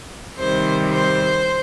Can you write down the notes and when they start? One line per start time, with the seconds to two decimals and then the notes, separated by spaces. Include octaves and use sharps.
0.37 C3 D#3 G3 C5
0.90 C5